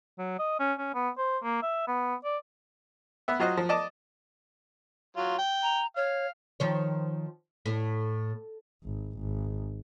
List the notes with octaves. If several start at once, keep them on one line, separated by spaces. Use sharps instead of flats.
F#3
D#5
C#4
C#4
B3
C5
A#3
E5
B3
D5
B3 E5
F#3 F4 F#4 C5 D#5
F3
D5 D#5 A5 D6
F#3 F4
G5
A#5
C#5 F5
D#3 F3 C#5
A2
G#1
G#1